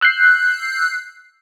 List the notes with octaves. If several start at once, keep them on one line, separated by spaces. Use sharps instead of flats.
E6 F#6 G6 C7